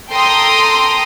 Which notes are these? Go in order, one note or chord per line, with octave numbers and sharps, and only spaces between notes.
A4 G5 A#5 C6 D#6